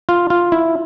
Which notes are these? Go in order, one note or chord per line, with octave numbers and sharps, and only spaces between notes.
F4
F4
E4